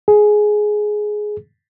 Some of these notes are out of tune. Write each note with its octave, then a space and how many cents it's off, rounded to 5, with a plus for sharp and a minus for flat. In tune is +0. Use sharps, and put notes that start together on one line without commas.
G#4 +10